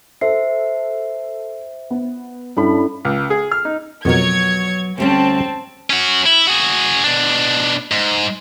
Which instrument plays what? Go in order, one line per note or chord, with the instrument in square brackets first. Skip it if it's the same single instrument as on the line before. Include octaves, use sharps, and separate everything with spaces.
[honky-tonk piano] A4 [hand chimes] C5 E5 C7
[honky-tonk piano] B3
[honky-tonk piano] G2 B5 [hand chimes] C#4 E4 A4
[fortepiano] C#2
G#4
F6
D#4
[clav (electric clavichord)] F2 B2 A#4 [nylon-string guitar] F#3 B3 [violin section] C#5 G#6
[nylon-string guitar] D2 G3 C#4 [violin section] C4 A5
[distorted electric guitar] C#4 F#4
E4
F#4 G#4
B2 D4
G#2